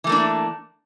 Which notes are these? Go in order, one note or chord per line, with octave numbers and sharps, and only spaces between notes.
E3 A3 A#3 D4